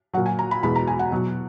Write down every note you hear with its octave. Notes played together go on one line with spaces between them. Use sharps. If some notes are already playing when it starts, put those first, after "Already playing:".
A#2 F#3 F#5
G#5
A#5
B5
E2 B2 G#3 B5
A#5
G#5
F#5
B2 F#3